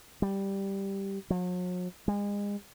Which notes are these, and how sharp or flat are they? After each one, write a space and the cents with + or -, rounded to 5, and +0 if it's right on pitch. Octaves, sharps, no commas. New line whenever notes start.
G3 +0
F#3 -45
G#3 -35